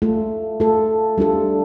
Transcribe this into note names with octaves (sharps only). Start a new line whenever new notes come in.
A3 F4 A4
A3 F4 A4
G3 D4 F4 A4